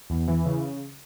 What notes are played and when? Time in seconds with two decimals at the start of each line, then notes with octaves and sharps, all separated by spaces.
0.10 E2
0.28 E3
0.46 C#3